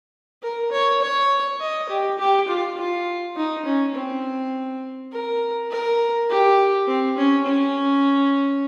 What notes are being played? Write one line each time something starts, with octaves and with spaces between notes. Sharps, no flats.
A#4
C#5
C#5
D#5
G4
G4
F4
F4
D#4
C#4
C4
A#4
A#4
G4
C4
C#4
C#4